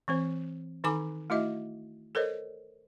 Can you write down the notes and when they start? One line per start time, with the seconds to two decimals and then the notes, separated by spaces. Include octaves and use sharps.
0.08 E3 C4 C5
0.84 D#3 D#4 A4 G#5 B5 D6
1.30 A3 E4 F#4 D#5 E5
2.15 A4 A#4 C5 C#5 D#5